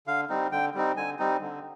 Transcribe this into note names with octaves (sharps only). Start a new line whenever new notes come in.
D3 F5
G3 C4 D#4
D3 G5
G3 C4 D#4
D3 G#5
G3 C4 D#4
D3